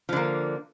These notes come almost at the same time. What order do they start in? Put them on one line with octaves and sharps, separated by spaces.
F3 D3 A#3